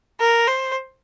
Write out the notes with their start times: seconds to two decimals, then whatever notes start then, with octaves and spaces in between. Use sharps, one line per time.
0.20 A#4
0.47 C5